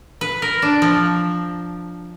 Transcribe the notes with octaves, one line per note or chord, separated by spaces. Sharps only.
B4
A#4
D4
F3